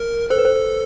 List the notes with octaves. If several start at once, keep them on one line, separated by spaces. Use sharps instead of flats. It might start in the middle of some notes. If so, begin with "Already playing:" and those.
Already playing: A#4
A4 C5
B4
C5